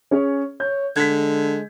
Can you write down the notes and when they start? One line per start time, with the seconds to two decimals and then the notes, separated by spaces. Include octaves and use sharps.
0.11 C#4 G#4 C#5
0.60 C#5 G6
0.96 D3 G#3 G#6 B6